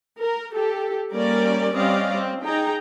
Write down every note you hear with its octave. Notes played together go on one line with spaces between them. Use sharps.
A#4
G4 A4
G3 A#3 C#4 A#4 D5
G3 C4 C#4 D5 D#5 F5
C4
D#4 G#4 G5 A#5